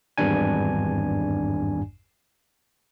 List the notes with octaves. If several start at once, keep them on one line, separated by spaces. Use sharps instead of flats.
G#1 E2 G2 D4 G#5